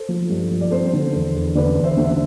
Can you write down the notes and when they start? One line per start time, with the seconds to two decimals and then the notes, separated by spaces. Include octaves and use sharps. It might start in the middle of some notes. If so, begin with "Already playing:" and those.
Already playing: A4 C5
0.09 F3
0.29 G2
0.51 F3
0.61 D5
0.71 C4 A4 C5
0.93 D3
1.14 E2
1.35 E2
1.55 D3 B4 D5
1.77 E2
1.84 C5 E5
1.97 D3
2.05 E5